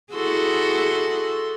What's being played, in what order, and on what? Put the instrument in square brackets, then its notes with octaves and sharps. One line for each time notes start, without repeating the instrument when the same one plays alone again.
[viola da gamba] E4 F#4 G#4 [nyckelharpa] A4 C6